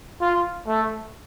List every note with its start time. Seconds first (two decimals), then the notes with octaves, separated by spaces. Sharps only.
0.21 F4
0.68 A3